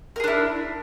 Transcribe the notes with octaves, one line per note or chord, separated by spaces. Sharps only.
D4 E4 G#4 A#4